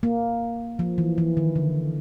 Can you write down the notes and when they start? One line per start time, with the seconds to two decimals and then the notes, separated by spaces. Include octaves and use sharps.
0.03 A#3
0.79 F3
0.98 E3
1.18 E3
1.37 D#3
1.56 D3